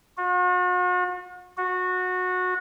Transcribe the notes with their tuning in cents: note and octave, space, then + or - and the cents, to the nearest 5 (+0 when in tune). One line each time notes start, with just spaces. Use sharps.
F#4 -45
F#4 -20